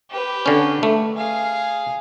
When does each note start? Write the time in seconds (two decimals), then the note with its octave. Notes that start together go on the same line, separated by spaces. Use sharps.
0.11 G4 B4
0.46 D3 C#4
0.83 A3
1.16 G#4 F5